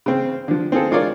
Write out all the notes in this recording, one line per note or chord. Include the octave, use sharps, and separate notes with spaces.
C#3 C4
D3 F3
C4 F4 G#4 A4
G#3 D4 F4 A#4 C#5 D5